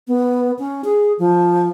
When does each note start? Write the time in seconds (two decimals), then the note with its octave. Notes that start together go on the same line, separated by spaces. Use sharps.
0.08 B3
0.59 C#4
0.84 G#4
1.19 F3